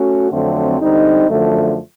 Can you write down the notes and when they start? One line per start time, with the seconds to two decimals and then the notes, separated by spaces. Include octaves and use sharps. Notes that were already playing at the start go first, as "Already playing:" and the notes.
Already playing: A3 C#4 F#4
0.32 F2 D3 F#3 A3 C4
0.80 D3 G3 C4 D#4
1.28 F#2 D3 F3 A3